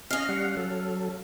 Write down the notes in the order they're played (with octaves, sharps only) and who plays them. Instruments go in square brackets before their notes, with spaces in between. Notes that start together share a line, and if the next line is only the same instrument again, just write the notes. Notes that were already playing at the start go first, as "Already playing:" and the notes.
[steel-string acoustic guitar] C#4 F5 [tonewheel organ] D#5
[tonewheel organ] G3 F#5
F#3 A4